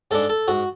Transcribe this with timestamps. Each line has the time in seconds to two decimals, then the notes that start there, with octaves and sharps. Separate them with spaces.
0.11 G#2 G#3 D4 A4
0.29 A4
0.48 G#2 F#4